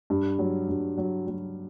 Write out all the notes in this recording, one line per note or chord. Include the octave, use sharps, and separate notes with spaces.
G2
F#3
G2
F#3
F#3